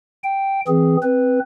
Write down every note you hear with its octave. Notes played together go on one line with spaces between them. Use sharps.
G5
E3 C4 G#4
C4 B4